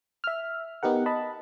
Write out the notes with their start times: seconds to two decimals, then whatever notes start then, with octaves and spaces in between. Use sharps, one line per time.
0.24 E5 F6
0.83 B3 D#4 G4 A#4 F#5
1.06 D#5 A5 B5